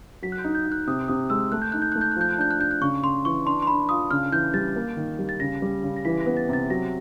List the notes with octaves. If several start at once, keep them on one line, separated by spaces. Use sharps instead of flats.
F#3 B6
F#6
G6
D#4
G6
D#4
F#6
C3 D#6
C3 D#6
G#3 E6
A3 F#6
G6
D#4 F#6
G6
A3 F#6
G6
F#6
F3 G6
F#6
D4 G6
F#6
D4 G6
F#6
C#3 C#6
C#3 C6
E3 C#6
D4 C6
C6
D4 B5
F4 D#6
C#3 F6
E3 G6
G3 A6
A#3
D#3
G3
A6
C#3 A#6
G3
C#3
A#6
E3 B6
A#6
B3
A6
C3 A6
F#3 A#6